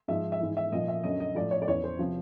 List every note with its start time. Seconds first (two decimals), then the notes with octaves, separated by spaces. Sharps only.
0.08 G#2 F3 E5
0.32 E5
0.40 G#2 E3
0.57 E5
0.72 A#2 F3 D#5
0.88 E5
1.03 F#2 D3 F#3 D#5
1.20 D#5
1.35 A2 F3 D5
1.51 C#5
1.62 D5
1.67 E2 C#3 E3 C#5
1.84 C5
1.99 C3 F3